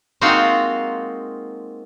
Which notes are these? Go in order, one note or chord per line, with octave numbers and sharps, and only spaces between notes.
G#3 A#3 C4 D#4 F4 F#4